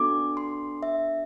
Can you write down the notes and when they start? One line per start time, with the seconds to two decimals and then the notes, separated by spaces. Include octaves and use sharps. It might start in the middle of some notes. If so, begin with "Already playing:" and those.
Already playing: B3 D4 F#4 A4 D6
0.37 C6
0.83 E5